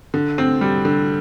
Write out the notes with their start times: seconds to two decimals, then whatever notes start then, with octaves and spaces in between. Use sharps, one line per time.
0.14 D3
0.38 C4
0.61 G3
0.85 D3